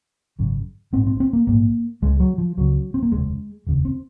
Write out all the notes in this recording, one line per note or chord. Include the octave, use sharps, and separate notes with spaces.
G#1 F#2 C#3
A#1 G#2 C4
C4
C4
A#3
A#1 G#2 A#3
C#2 C#3 G#3
F#3
F3
C#2 C#3 F#3
C4
A#3
F1 D#2 C#3 G#3
F1 D#2 C#3
C4